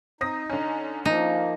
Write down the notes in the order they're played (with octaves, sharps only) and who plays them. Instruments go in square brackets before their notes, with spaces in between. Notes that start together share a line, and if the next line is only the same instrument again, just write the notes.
[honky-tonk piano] C4 D#6 A#6 [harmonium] D#4
[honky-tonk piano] D3 C#4
[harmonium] F3 A#3 [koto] D#4